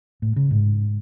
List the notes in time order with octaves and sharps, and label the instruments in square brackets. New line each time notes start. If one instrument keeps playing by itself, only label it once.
[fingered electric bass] A2
C#3
G#2